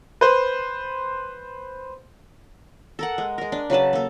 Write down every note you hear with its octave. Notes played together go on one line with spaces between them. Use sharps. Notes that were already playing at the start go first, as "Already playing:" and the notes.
B4 C5
A4 A#4 F#5
G#3
G#3 A#4
D4
C#3 F#3 B4 A5
A#3 A4